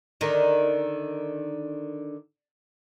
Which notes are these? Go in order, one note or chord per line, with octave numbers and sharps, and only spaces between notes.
D3 D#3